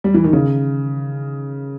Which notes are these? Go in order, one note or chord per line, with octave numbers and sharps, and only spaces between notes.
G3
E3
D#3
C#3